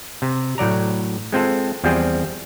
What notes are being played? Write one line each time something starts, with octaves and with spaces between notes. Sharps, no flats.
C3
A2 F#3 D5 A#5
G#3 C4 F4 A4
E2 F3 G3 C4 G#4 G5